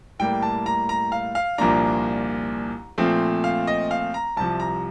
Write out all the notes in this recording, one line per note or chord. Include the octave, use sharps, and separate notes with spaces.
A2 G3 A#3 G5
A5
A#5
A#5
F5
F5
C2 A#2 F3 A#3 D4 A#5
A#2 F3 A3 C4
F5
D#5
F5
A#5
C2 C3 F3 A5
A#5